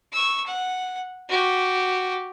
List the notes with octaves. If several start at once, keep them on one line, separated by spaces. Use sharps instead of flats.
C#6 E6
F#5
F#4 G4